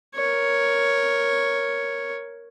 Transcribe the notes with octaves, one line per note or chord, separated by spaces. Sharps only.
A#4 C#5